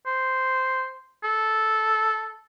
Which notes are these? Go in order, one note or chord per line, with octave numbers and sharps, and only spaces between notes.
C5
A4